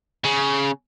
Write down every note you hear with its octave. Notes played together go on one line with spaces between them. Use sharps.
C#3